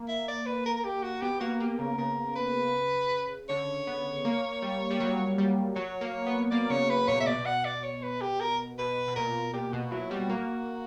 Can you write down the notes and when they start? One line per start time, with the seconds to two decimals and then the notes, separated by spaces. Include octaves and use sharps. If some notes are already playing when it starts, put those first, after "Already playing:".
Already playing: A#3
0.09 E5
0.28 D5
0.46 B4
0.66 A#4
0.77 A#4
0.85 G4
1.03 F#4
1.22 B3 G4
1.41 A#3 F#4
1.60 A#3 G4
1.79 C#3 A#4
1.98 C#3 A#4
2.36 B4
3.49 D3 C#5
3.87 B3
4.25 A#3
4.62 G3
4.91 G3
5.00 F#3
5.38 G3
5.76 F#3 C#5
6.01 A#3
6.26 B3
6.51 A#3 D5
6.70 C#3 C#5
6.90 B4
7.08 A#2 C#5
7.21 E5
7.27 B2 D5
7.46 F#5
7.65 D5
7.83 C#5
8.03 B4
8.21 G4
8.40 A#4
8.78 B2 B4
9.08 B2
9.16 A#2 A#4
9.54 A#2 G4
9.73 B2 F#4
9.92 F#3 E4
10.11 G3 F#4
10.30 A#3 F#4